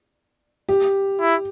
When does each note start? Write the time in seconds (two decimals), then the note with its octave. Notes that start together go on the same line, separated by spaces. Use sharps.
0.69 G4
1.20 E4